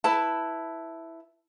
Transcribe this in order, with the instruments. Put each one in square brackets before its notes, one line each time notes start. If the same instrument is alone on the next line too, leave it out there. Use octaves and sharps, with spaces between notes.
[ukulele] E4 B4 A5